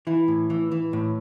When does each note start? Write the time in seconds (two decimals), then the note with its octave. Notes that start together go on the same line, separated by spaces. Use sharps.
0.07 E3 E4
0.28 A2
0.50 E3
0.71 E3
0.93 A2